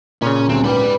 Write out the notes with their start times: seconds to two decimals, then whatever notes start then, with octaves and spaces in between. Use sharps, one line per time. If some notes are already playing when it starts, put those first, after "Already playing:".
0.22 A#2 C#3 C#4
0.49 D#1 D2 C4
0.64 G#2 B4 D5 G5 B5